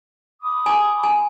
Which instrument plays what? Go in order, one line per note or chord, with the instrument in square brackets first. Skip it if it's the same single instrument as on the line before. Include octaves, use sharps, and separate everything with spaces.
[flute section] B5 D6 D#6
[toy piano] G#5
G#5